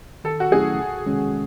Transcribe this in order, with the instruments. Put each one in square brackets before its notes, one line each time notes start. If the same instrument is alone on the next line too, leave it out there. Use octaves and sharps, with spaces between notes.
[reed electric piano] D#3 [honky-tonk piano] A4
[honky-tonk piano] F#4
[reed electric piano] F#3 A3 C#4 E4 [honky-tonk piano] G#4
[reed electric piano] C2
C3 D#3 G#3 C#4